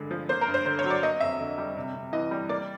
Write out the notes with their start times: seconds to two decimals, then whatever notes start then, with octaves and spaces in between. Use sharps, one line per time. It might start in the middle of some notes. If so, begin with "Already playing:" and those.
Already playing: G2 D3 G#3
0.11 F3
0.29 A#3 C5
0.41 A#4
0.48 G2
0.54 C5
0.65 D3 C5
0.79 C#5
0.84 F#3
0.90 D5
1.03 A#3 D#5
1.20 F2 E5
1.40 D3
1.58 G3
1.76 C3
1.94 C3
2.13 E3 D#5
2.31 G3
2.49 A#3 D5